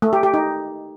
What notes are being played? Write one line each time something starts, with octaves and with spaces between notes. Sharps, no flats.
A3
G4
G4
D#4